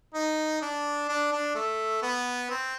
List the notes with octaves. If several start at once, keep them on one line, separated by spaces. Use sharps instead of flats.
D#4
D4
D4
D4
A3
B3
C4